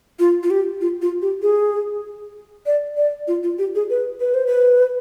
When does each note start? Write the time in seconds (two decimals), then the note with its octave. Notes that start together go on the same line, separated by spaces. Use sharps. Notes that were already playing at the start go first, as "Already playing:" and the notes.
0.19 F4
0.43 F4
0.51 G4
0.81 F4
1.02 F4
1.22 G4
1.42 G#4
2.66 D5
2.97 D5
3.28 F4
3.43 F4
3.59 G4
3.75 G#4
3.90 B4
4.20 B4
4.34 C5
4.47 B4